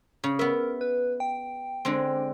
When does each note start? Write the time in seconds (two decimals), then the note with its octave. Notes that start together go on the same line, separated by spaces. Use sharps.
0.24 C#3
0.39 B3 A#4 E5
0.81 B4
1.20 G5
1.85 D3 G#3 C4